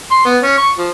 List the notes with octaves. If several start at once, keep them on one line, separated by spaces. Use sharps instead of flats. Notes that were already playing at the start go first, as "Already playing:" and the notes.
C6
B3
C#4
C#6
F3